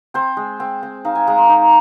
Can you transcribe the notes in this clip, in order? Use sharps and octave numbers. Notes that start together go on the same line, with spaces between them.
C4 C5
G#3
C4
C4
D#4 F5
G#5
G#3 A#5
C6
D#4 A#5